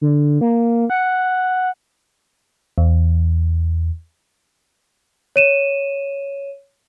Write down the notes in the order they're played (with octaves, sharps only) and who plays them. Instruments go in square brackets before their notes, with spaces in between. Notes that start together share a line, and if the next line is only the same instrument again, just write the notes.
[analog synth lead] D3
A#3
F#5
[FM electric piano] E2
[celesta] C#5 D#7 E7